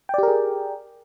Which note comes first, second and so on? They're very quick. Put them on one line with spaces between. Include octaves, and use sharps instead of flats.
G5 D5 G4 A#4 G#4